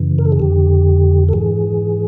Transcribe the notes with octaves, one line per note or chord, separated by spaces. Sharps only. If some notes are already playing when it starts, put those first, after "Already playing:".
Already playing: F#2 C#3 E3
A#4
A4
G#4
F2 D3 G4
A4
G#2 E3 G#4